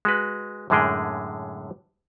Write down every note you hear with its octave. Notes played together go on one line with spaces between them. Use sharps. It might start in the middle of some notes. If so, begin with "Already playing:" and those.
G#3 F#4 B4
F#2 A2 D3 G#3 G#4 G5